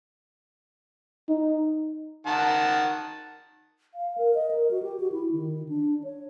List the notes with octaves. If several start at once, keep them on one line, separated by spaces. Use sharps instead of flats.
D#4
D#3 F#5 A5
F5
A#4
D#5
A#4
F#4
G4
F#4
E4
D#3
D4
C#5